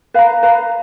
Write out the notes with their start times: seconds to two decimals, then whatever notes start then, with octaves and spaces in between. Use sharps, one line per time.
0.14 B4 F5 A#5
0.43 B4 F5 A#5